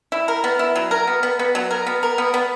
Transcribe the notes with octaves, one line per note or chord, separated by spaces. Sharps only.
E4
A#4
B3
E4
F#3
A#4
B3
B3
B3
F#3
A#4
B3
A#4
B3
B3